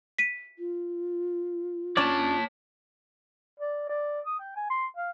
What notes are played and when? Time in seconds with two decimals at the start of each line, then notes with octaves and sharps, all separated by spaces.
0.18 B6 D#7
0.59 F4
1.97 C#4 D4 C#5 D5 A5
3.60 D5
3.89 D5
4.26 D#6
4.39 G5
4.56 G#5
4.70 C6
4.96 F5